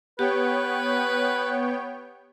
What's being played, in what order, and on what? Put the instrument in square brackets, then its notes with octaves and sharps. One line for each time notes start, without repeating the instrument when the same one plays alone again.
[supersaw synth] B3 C#5 G5 [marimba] G4 [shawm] B4